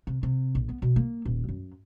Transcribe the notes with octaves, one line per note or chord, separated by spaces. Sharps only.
C3
C3
A#1
B3
B2
A#3
D#1
F#2